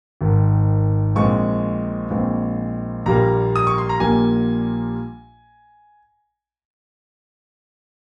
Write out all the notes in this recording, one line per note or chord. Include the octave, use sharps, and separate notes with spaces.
G#1 G#2 D#3
A#1 A#2 G#3 C4 C#6
A#1 A#2 G#3 C4
A#1 A#2 G3 A#3 A#5
D#6
C#6
C6
A#5
A#1 A#2 G3 A#3 G#5